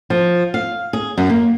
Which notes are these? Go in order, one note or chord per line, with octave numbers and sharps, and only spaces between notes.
F3
F5
G#4
F#2
A#3